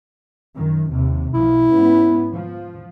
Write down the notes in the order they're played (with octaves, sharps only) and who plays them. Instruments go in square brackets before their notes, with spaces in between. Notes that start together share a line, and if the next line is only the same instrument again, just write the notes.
[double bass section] F#2 D#3
D#2 C3
[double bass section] B1 F3 [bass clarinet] E4
[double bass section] G#2 B3 C#4
F3